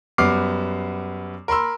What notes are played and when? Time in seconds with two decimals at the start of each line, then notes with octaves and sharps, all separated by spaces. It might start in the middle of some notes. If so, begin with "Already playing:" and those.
0.18 F#2 G3 B3 D6 F6 C7
1.48 A#4 B5 C6 E6